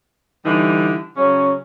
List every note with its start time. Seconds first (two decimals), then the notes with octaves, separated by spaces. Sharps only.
0.45 D3 E3 G3 D#4 E4
1.16 C#3 F#3 C#4